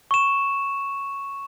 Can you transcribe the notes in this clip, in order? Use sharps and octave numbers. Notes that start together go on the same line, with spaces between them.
C#6 E7